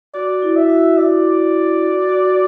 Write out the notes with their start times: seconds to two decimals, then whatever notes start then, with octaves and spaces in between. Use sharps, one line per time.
0.14 F#4 D5
0.42 E4
0.56 E5
0.70 F#4
0.97 F#4 D5
1.82 F#4
2.09 F#4